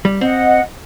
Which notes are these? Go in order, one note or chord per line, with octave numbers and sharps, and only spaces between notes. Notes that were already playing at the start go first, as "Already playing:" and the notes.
G3
C4 D#5 F#5